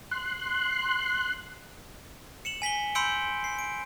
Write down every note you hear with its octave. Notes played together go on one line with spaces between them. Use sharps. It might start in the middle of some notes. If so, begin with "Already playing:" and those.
C6 F#6
C#7 E7 F#7
G#5 B6 F#7 G7
B5 C6 E6 G6 C#7 D7
C7
D7